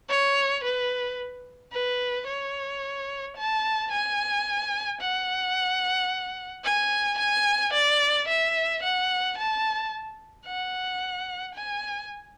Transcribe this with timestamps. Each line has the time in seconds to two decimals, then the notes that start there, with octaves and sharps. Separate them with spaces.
0.09 C#5
0.64 B4
1.72 B4
2.27 C#5
3.37 A5
3.92 G#5
5.01 F#5
6.64 G#5
7.19 G#5
7.74 D5
8.28 E5
8.83 F#5
9.38 A5
10.47 F#5
11.55 G#5